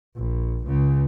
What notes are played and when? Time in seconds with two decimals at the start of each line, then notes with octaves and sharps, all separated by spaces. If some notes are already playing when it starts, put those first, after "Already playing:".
0.17 A#1
0.67 C#2 C#3